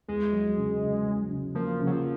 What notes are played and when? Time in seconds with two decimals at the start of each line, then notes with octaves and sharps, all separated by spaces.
0.08 E2 G#3
0.33 F#3
0.57 C#3
0.82 C#3
1.07 F#3
1.31 C#3
1.55 F3 A#3
1.80 C#3
1.87 F#3
1.92 F3